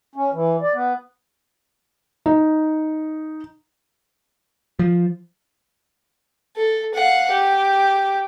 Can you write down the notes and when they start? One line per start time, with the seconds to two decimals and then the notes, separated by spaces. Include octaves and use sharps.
0.15 C#4
0.33 E3
0.61 D5
0.74 B3
2.26 D#4
4.79 F3
6.56 A4
6.95 F5 F#5
7.31 G4